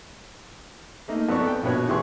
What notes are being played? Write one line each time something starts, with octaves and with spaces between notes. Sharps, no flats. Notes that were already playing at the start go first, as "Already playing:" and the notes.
A3 A#3 D#4
F2 B3 A4 D5 C#6
G5
A#1 B2 B4 C#5
A1 E3 G4 G#4 C6 C#6